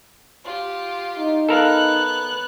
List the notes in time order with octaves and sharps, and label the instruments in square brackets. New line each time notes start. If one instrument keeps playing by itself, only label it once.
[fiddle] F4 G4
[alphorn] D#4
[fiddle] B3 F#6 [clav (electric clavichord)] A4 A#4 F5